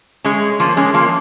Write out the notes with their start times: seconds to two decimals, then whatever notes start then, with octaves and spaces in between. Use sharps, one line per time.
0.24 G#3 C#4
0.60 F3 A#3
0.77 G#3 C#4
0.94 F3 A#3